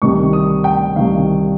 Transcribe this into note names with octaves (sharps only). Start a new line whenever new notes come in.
C2 C3 D#3 C#6
D#6
G5
C2 C3 D#3 F5